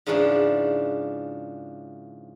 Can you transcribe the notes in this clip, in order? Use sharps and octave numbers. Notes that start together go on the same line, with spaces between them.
G#2 C#3 E3 F3 D4